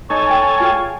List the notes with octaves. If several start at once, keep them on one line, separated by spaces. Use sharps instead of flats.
D#4 A4 C#5 G#5
G5
F4 G#4 G5